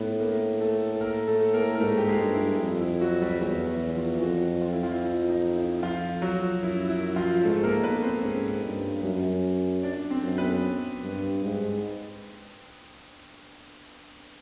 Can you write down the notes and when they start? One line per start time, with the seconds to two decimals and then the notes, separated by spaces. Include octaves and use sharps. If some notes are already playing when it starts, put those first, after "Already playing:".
Already playing: A2 B3 D4 B4
0.20 A#3 A#4
0.60 A3 A4
0.96 A4
1.01 A#3 A#4
1.27 A3 A4
1.53 A#3 A#4
1.75 A#4
1.80 G#2 A3 A4
1.97 G4
2.07 G#3 G#4
2.21 G2
2.34 E4
2.61 F2
2.81 E4
3.01 F#3 F#4
3.22 G3 G4
3.41 E2 F#3 F#4
3.68 E4
3.95 F3 F4
4.21 F2 F#3 F#4
4.61 F4
4.73 E4
4.83 F3 F4
5.02 E4
5.29 D#4
5.55 E4
5.83 F3 F4
6.22 F#3 F#4
6.62 F#2 E4
6.89 E4
7.16 F3 F4
7.43 G#2 A3 A4
7.63 A#3 A#4
7.83 B3 B4
8.03 C4 C5
8.23 G#2 C#4 C#5
8.64 G2
9.03 F#2
9.83 D4 D5
10.10 C4 C5
10.24 F#2
10.38 B3 B4
11.04 G2
11.45 G#2